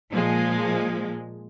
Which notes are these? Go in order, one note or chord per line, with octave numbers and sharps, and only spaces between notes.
A#2 F3 G#3